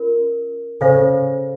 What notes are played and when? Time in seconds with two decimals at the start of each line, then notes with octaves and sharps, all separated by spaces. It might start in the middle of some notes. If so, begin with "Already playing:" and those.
Already playing: C#4 F4 A#4
0.81 C#3 A4 C5 F5 G#5